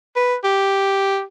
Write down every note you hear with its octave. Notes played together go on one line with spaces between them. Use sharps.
B4
G4